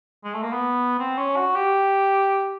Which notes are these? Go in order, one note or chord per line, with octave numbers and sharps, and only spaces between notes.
G#3
A3
A#3
B3
C4
C#4
F#4
G4